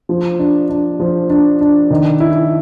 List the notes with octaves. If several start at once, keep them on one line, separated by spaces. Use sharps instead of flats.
F3
D4
D4
F3
D4
D4
D#3
E4